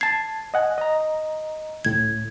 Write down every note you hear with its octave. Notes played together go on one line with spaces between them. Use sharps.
A5 G#6 A6 C7
D#5 F#5 G#5
D#5 A#5
C#2 A2 G#6